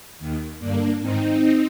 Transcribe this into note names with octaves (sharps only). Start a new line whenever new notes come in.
D#2 D#3
G2 D3 A#3 D4
G#2 D#3 C4 D#4